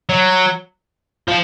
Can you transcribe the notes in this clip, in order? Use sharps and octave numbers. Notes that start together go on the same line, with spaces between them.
F#3
F3